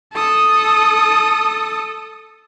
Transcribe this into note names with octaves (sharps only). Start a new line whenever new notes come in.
A4 D#6